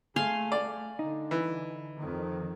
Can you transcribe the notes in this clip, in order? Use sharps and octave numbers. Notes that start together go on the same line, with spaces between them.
A3 G#4 F5 G#5 C6
D5
D3 D#4
E3
F2 D#3